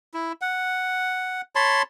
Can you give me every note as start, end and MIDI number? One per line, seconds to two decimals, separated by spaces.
0.14 0.32 64
0.41 1.41 78
1.55 1.82 73
1.55 1.82 81
1.55 1.82 83
1.55 1.82 84